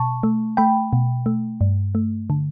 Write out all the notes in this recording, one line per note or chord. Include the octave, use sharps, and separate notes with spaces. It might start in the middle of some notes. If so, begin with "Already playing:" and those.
Already playing: B2 A5 C#6
A3
A3 G5 B5
B2
A3
G2
A3
D3